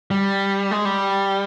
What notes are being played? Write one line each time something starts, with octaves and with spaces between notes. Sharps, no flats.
G3
G#3
G3